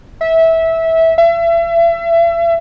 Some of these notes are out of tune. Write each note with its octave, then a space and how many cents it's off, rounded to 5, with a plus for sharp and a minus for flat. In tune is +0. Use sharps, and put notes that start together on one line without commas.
E5 -15
E5 +35